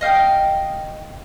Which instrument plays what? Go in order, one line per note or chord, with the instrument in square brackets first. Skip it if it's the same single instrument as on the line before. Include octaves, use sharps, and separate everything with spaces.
[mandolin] D#5 F5 G5 D#6